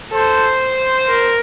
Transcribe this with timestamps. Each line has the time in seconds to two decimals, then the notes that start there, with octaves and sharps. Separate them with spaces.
0.12 A4 C5
1.07 A#4